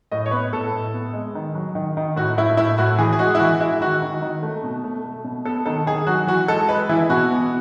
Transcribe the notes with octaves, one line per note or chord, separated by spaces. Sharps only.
A2 D#5
C#5
B3 B4
A2 A4
A2
B3
G#3
D#3
F#3
D#3
D#3
A2 F#4
A2 E4
A2 E4
A2 F#4
E3 G#4
G#4
G#3 F#4
E4
E3 F#4
G#3 E4
D#3 F#4
D#3
D#3
A3
B2
A3
A3
B2
B3 A4
D#3 A4
D#3 G#4
F#3 F#4
E3 F#4
G#3 A4
G#3 B4
E3 E4
B2 F#4
B3